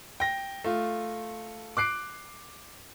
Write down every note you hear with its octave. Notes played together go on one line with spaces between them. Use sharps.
G5 A#6
A3 F4
D6 F#6 C7 D7